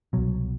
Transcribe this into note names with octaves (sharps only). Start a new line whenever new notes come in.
C2 B2 F#3